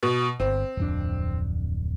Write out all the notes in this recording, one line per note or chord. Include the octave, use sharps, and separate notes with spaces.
B2
G1 C4
D1 F2 D4